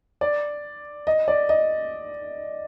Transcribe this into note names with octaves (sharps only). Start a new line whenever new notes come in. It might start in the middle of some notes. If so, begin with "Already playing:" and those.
D5
D#5
D5
D#5